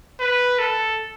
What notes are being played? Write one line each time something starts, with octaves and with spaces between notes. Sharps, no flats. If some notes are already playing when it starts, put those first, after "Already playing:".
B4
A4